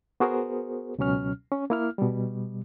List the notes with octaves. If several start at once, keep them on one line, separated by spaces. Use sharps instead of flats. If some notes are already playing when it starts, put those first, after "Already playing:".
B3 F#4 G#4 A#4 C5
C#2 B2 F#3 C#4 F6
C#4
A#3 E4 F6
B2 G3